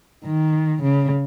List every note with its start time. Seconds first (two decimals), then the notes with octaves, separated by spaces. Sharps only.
0.24 D#3
0.82 C#3